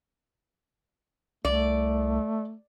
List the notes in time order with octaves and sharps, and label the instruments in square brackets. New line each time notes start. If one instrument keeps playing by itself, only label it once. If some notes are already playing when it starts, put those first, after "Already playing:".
[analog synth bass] C2 [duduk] A3 [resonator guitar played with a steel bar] D5